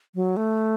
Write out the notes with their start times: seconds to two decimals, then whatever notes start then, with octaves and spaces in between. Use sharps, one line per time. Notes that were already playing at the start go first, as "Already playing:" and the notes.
0.15 F#3
0.37 A3